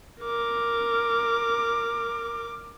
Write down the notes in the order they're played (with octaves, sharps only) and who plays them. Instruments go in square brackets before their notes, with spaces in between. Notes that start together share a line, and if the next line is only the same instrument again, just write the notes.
[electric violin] A#4 D6